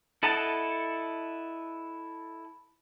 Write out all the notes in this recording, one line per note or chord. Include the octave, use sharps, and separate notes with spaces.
E4 A4 D#5 F#5 A5